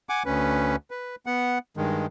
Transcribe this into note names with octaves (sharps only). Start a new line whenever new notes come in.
F#5 G#5 D6
D2 C#4 B4
B4
B3 F#5
G2 D#3 G#3